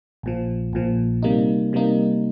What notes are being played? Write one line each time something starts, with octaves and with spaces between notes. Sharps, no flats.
A#1 A#2 F3
A#1 A#2 F3
C3 G3 A#3 D#4
C3 G3 A#3 D#4